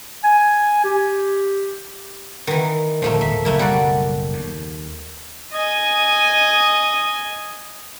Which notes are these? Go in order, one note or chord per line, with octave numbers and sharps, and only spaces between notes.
G#5
G4
D#3 E3
D1 D3 F3 A3 A#3
D1 G#2 E5
F#1 B1 A3 A#3 E4
G3 F#4 D5
D#2
D#5 G#5